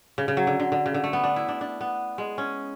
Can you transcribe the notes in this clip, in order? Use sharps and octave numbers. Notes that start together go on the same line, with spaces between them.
C#3
C#3
F#3
D3
D3
D3
C#3
D3
A3
B3
D4
E4
D4
D4
B3
G#3
C#4